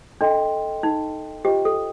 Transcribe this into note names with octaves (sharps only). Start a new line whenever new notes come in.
D4 A4 D#5 G5 C6
D#4
F4 G4 C5 D#5 G5 D6
A4